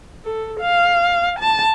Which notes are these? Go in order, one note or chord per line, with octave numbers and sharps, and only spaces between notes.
A4
F5
A5